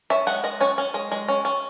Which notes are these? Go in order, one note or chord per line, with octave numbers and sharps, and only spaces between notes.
C#4 E5
G#3 F#5
G#3 D#5
C#4 C#5
C#4
G#3
G#3
C#4
C#4